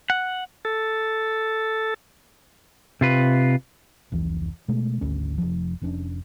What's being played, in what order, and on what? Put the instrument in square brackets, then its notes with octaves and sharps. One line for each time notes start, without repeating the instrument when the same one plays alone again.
[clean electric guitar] F#5
[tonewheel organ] A4
[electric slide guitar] C3 F4 B4
[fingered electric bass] F1 C#2 E3
B2 G#3 A3
G#1 D2 C#4
F1 F3
F1 F3 C#4 D4